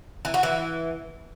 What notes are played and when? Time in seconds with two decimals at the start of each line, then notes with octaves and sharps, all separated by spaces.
0.25 E3
0.34 F#4
0.43 E3